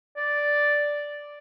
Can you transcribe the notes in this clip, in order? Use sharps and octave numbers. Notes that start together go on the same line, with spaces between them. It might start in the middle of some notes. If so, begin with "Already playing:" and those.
D5